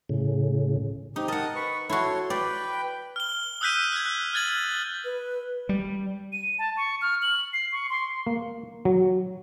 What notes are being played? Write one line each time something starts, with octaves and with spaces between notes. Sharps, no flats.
A2 C#3
C4 D#4 G4
A#4 D#5 F#5 A5 D#6
B4 C#6
E4 F#4 A4 C#5 C6
B4 D5 G5
F6 G7
D#6 E6 F#6 G6 B6 D#7
F#6 G#6
F#6
F6 F#6 G#6 A6 F#7
B4
G3
D#7
A5
C#6
F6
F#7
C7
C#6
C6
A#3
F#3